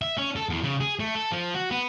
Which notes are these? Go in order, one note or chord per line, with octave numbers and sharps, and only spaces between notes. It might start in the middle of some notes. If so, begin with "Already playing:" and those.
E5
C#4
A4
E2
C#3
G#4
A3
A4
F3
F#4
B3